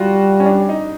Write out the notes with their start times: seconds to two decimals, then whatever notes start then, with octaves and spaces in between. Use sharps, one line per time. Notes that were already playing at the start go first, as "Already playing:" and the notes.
Already playing: G3 F4 F#4
0.40 C#4
0.46 D4
0.69 D#4